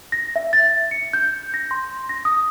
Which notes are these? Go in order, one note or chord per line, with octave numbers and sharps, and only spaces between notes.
A#6
E5
A6
C#7
G6
A#6
C6
A#6
D#6